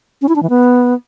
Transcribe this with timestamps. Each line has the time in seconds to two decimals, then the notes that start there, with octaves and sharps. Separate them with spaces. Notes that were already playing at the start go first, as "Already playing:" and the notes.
0.22 C#4
0.29 E4
0.36 D4
0.43 E3
0.50 B3